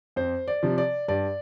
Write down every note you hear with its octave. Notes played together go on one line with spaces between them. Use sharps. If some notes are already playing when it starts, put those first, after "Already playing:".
F2 C5
D5
C3 F3
D5
G2 D5